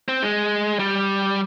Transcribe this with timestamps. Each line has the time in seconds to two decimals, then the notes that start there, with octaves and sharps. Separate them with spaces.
0.08 C4
0.22 G#3
0.79 G3